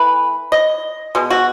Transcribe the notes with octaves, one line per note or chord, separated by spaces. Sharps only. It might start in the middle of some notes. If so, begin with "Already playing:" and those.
Already playing: E3 A3 B4
D#5
B2 G#3
F#4